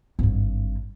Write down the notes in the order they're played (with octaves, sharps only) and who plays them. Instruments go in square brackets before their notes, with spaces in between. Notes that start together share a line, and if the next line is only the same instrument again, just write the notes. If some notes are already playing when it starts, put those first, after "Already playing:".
[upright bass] G#1 G2